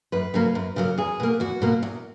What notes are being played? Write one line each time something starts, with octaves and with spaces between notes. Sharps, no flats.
F#2 B4
C#3 F#3 A#3
F#2
C#3 F#3 A#3
E2 G#4
B2 A#3
E2 F#4
B2 A#3
E2